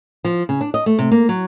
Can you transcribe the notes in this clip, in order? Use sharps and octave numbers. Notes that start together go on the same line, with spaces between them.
F3
C#3
D4
D#5
A3
C3
A#3
F#3